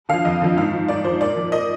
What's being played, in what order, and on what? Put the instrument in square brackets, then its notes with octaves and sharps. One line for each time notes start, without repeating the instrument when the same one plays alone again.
[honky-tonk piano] D3 F5
F3
F2 D#5
D3 F3
G#2 F5
F3
G#2 D5
F3 C5
A#2 D5
F3
A#2 D#5